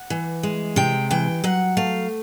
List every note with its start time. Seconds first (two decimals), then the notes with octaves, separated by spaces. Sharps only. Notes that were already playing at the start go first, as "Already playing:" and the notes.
Already playing: F#5
0.10 E3
0.43 G#3
0.76 C3 G5
1.11 E3 G5
1.44 F#3 F#5
1.77 A3 F5